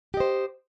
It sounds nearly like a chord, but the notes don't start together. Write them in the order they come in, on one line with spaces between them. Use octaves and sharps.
G4 D#5 C5